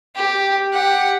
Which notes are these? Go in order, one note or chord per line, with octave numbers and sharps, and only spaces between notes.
G4
G4 F#5